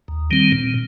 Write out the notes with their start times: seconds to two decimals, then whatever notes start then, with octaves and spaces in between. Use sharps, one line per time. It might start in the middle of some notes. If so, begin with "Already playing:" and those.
0.08 D#2
0.31 D#3 G3 C4
0.52 A#2